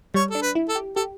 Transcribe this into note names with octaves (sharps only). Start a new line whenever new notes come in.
G3 C#5
D4 A4
B4
E4
A4
G4
G4 A4